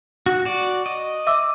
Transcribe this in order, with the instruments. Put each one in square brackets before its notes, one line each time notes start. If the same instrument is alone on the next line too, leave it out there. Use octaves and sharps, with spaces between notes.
[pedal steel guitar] F#4
F#4 D5
D#5
[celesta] E5 D6 E6